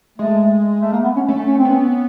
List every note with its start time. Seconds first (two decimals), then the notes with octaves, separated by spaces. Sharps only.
0.18 G#3 A3
0.82 A3
0.92 A#3
1.04 B3
1.16 C#4
1.28 A3 C#4
1.47 C#4
1.58 C4
1.65 B3 C#4